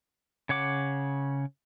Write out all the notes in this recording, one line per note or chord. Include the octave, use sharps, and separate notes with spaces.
C#3 C#5 F#5 D6